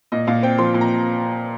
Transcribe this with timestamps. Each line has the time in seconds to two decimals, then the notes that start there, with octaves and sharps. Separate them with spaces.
0.12 A#2 D#5
0.27 A#2 F5
0.43 C4 G5
0.58 F3 C6
0.74 A#2
0.81 A#5